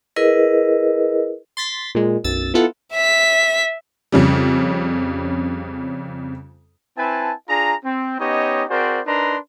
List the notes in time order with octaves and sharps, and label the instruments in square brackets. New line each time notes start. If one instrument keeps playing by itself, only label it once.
[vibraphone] E4 G#4 A#4 B4 D#5
[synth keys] C6 A6 B6
A#2 G#3
B1 F#2 E6 A6
B3 E4 F4 A4 F#5
[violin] E5 B6
[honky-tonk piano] F2 C#3 G3
[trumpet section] C4 E4 B4 G#5 A5
D4 F4 G#4 A#5
C4
B3 C#4 D#4 G4 C#5 D#5
C4 F#4 G#4 A#4 C5 D5
D4 D#4 A#4 B4 A#5 C6